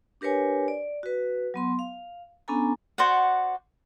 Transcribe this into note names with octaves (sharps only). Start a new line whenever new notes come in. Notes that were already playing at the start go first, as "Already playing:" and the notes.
D4 G4 A#4 B4 C#5 G#5
D5
F#4 B4
F#3 B3 C6
F5
B3 C#4 D4 A4 G#5 A#5
F#4 C5 D5 F#5